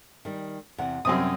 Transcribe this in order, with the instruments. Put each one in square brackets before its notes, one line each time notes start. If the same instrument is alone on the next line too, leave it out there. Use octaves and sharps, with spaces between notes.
[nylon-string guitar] D#3 G3
E2 C3 F#5
[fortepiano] F#2 C4 D#6 [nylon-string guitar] C3 G3 C#4